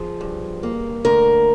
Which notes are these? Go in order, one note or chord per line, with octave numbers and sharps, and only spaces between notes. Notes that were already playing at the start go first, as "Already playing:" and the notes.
Already playing: F3 G#4
G2
A#3
D2 A#4